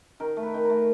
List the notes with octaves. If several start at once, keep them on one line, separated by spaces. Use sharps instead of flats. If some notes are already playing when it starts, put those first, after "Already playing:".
D#3 A#4
A3
B4
D#3
A3 A#4